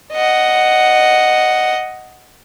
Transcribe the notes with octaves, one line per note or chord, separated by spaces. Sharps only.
D#5 F#5